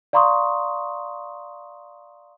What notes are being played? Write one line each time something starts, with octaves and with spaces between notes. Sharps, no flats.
D5 F5 A#5 C6 C#6 D#6